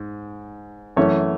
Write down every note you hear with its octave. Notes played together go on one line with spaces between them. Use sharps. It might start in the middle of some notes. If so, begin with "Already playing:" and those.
Already playing: G#2
F#2 E3 A3 C#4 E4 C#5